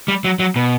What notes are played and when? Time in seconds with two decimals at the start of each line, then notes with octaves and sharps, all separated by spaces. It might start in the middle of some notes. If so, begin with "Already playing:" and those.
0.08 G3
0.24 F#3
0.39 F#3
0.56 B2